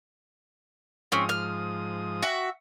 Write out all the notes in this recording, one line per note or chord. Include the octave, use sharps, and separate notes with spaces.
G#2 F3 C4 C#4 D#6
F6
F#4 E5